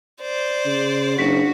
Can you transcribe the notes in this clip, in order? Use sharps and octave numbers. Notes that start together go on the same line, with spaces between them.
C5 D5
C#3
F#1 D4 F#4 B6